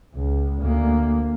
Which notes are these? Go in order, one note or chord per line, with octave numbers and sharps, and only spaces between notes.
C#2
D2 A#3